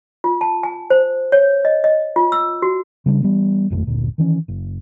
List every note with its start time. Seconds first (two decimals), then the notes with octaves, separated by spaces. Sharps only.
0.24 F4
0.41 A5
0.63 G#5
0.90 C5
1.32 C#5
1.65 D#5
1.84 D#5
2.16 F4
2.32 E6
2.62 F#4
3.06 C#3 G3 C4 D4
3.23 E3 G3 B3
3.70 D#1 G#1 F2 A3
3.87 G1 D2 A#2
4.18 D#3 E3 C#4
4.48 F#1